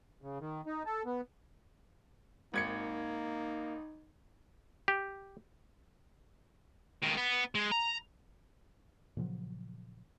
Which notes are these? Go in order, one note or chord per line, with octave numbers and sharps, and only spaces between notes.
C#3
D#3
D#4
A4
B3
G#1 A#3 D#4 G#6 C#7
G4
C#2 D#3
B3
G#3
A#5
A#2 C#3 F3 F#3